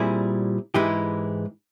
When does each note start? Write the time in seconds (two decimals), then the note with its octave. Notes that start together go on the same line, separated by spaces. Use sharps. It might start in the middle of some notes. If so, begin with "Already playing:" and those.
Already playing: A#2 G3 C4 E4 G#4
0.74 G#2 E3 G#3 E4 G4